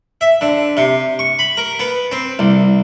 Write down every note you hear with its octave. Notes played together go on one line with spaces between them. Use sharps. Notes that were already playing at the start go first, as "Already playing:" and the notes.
E5
D3
C3
C#6
B5
A#4
B3
C4
C2